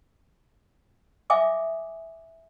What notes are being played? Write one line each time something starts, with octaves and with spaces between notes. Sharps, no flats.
E5 F5 G#5 D6 D#6